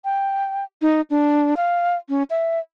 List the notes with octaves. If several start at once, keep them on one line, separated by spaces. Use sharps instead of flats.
G5
D#4
D4
F5
C#4
E5